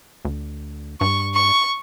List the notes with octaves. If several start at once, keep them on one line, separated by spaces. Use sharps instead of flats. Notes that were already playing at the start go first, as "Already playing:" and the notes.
D2
G2 C#6
C#6